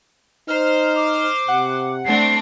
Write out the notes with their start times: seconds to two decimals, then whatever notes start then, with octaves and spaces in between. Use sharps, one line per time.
0.48 D#4 C5 F6
0.96 D6
1.48 C3 F#5
2.05 A3 C4 D4 C7